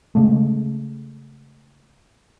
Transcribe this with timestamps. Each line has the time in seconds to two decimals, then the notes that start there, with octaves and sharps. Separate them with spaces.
0.15 C#3 G#3 A3